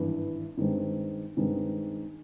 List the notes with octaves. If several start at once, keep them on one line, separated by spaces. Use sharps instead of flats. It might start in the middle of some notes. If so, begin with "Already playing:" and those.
Already playing: G#1 G2 E3
G2 D#3 G#3 C4
G2 D#3 G#3 C4